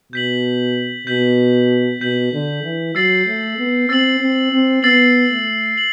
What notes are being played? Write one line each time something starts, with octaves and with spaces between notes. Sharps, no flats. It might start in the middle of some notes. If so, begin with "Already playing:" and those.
B2 G6 B6 F#7
B2 G6 B6 F#7
B2 G6 B6 F#7
D3
E3
F#3 E6 A6 C7 F#7
A3
B3
C4 E6 A6 C7 F#7
C4
C4
B3 E6 A6 C7 F#7
A3
F#7